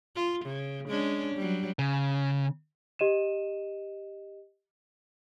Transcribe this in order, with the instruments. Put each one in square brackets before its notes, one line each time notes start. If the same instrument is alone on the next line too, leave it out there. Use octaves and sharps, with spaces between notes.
[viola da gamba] F4
C#3
G#3 C#4 D4
F#3 G3
[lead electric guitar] C#3
[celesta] G4 D#5 D#7 E7